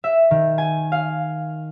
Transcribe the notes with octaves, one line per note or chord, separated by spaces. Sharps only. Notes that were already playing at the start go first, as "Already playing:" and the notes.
E5
D#3
G#5
F5